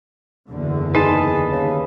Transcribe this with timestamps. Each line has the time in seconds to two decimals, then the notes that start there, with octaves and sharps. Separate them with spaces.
0.50 F#1 E2 D3
0.95 D#4 G#4 B4 D#5 A5
1.52 D#2 C#3